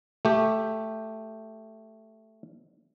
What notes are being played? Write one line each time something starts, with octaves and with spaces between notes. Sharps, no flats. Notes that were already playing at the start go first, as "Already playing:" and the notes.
A3 G4